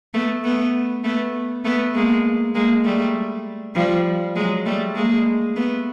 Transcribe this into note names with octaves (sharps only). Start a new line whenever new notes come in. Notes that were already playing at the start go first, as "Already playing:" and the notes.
A3 B3
A3 B3
A3 B3
A3 B3
G#3 A#3
G#3 A#3
G3 A3
F3 G3
F#3 G#3
G3 A3
G#3 A#3
A3 B3